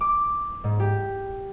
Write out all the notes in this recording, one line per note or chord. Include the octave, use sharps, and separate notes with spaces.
D6
G#2
G4